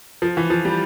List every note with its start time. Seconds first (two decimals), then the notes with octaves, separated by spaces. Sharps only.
0.22 F3
0.37 E3
0.50 F3
0.65 G3